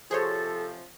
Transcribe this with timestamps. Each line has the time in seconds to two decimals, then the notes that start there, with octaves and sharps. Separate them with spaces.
0.11 C3 F3 G#4 A4 C5 C#5